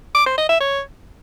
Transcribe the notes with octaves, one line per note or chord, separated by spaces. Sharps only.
D6
C5
D#5
E5
C#5